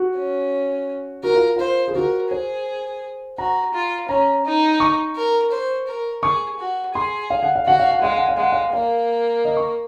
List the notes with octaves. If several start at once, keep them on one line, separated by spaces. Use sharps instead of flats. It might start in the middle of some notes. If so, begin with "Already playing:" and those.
Already playing: F#4
C#4
F#4 A#4
F4
F4 C5
G#4
F#4 A#4
G#4 C5
F#4 A#5
F4
C#4 A#5
D#4
C#6
A#4
C5
A#4
G#4 C#6
F#4
G#4 C6
F5
F#5
F5
F#4 F#5
F5
F#5
G#3 F5
F#5
F5
G#3 F#5
F5
A#3 F5
D#5
C#6